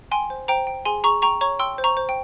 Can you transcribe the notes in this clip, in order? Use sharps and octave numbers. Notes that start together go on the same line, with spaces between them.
G5 G#5 C6
C5
C5 G5 A#5
G5
G#4 G#5 C6
G#4 A#5 C#6
G5 A#5 C#6
C#5 A#5 C#6
G5 C6 E6
C5
A#5 C#6
C5
G5